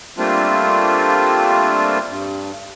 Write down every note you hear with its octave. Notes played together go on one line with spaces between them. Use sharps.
G3 A3 A#3 C4 D4 F4
G2